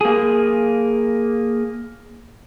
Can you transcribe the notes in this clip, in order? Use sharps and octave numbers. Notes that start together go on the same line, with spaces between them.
A#3 G#4